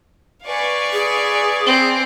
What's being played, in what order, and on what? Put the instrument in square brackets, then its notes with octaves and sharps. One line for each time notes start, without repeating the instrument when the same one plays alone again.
[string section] B4 G#5 C#6 [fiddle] D5 F5
[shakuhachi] G#4
[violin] C4